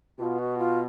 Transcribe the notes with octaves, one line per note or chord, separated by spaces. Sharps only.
B2 F4
F#4
F4